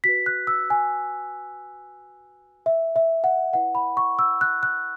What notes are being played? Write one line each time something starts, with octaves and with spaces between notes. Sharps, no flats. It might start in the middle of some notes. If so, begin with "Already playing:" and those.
F#4 B4 B6
F#6
E6
G#5
E5
E5
F#5
E4 B4 F#5
B5
C#6
E6
F#6
F#6